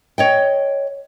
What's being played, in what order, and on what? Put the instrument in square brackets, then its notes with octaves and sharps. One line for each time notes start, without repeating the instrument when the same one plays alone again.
[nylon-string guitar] C#5 D#5 G5